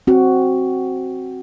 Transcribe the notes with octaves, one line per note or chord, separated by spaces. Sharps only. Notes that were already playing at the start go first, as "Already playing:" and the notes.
C4 F#4